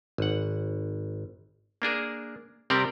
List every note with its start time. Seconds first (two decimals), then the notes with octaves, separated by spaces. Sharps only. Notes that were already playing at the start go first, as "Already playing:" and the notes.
0.18 G#1 F#5
1.82 A#3 D4 G#4 A#4
2.70 C3 G3 C4 G4 A#4 D5